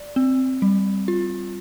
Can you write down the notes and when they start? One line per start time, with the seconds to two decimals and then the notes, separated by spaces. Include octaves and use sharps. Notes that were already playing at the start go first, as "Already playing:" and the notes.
Already playing: D5
0.16 C4
0.62 G3
1.08 F4